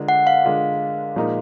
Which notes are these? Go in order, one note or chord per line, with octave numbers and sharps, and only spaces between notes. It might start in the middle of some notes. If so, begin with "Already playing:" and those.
Already playing: D3 G#3 D4 F4 A#4
F#5
F5
D3 G#3 D4 F4 A#4
A#2 F3 G#3 D#4 A#4